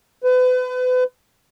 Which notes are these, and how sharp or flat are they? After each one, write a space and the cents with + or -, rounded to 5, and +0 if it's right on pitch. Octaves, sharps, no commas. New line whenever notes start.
B4 +35